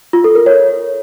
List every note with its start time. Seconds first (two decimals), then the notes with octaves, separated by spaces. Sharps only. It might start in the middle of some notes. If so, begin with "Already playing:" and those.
0.13 F4
0.24 A4
0.35 A#4
0.46 C#5